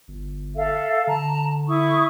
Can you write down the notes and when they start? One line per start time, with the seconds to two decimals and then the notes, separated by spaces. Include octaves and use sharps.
0.08 G1
0.57 A4 E5 F5
1.07 D3 A5 A#5
1.69 E4 C#6 D#6